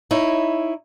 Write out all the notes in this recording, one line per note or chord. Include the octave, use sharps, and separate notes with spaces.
D#4 E4 C#5